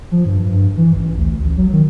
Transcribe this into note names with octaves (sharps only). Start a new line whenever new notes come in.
F3
G2
G2
E3
A1
D2
A1
F#3
D#3